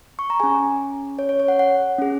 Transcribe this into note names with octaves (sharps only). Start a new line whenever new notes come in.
C#6
A#5
C#4 G#4 G#5
C#5
C#5
C#5
F#5
F#5
C#4 G#4